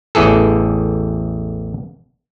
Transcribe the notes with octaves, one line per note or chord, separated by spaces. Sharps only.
A1 E2 E3 G#4 A4